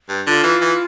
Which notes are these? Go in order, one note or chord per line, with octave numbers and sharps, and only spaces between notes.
G2
D3 F4
E3
E3